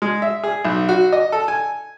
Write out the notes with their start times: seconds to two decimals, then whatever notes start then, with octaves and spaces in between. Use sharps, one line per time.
0.02 G#3
0.22 E5
0.44 G#4
0.65 B1
0.89 F#4
1.12 D#5
1.32 A4
1.48 G#5